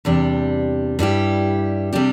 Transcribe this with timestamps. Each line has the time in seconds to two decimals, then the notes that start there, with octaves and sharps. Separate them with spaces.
0.05 E2 C3 G3 D4 G4
0.99 G2 G3 E4 G4
1.93 C3 G3 D4 G4